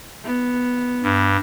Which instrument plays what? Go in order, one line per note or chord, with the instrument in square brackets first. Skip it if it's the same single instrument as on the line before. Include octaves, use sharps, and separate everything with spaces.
[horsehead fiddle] B3
[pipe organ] G2